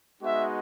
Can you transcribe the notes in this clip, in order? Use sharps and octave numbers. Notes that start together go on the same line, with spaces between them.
G#3 B3 D#4 F#4 E5